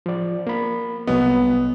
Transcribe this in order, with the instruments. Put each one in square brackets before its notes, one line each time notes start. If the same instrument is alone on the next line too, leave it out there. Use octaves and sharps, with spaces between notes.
[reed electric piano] F3 D5
A#3 B5
[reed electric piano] C2 F#3 D#5 [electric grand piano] B3